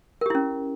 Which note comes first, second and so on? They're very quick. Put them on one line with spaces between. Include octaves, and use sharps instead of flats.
A#4 G4 E4 C#4